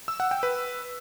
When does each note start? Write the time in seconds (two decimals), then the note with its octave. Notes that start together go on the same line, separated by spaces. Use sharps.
0.08 E6
0.20 F#5
0.31 G5
0.43 B4